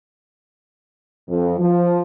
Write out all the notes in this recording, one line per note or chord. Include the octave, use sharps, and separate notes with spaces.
F2
F3